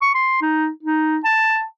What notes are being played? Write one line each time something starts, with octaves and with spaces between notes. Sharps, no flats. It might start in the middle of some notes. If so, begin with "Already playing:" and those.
C#6
C6
D#4
D#4
A5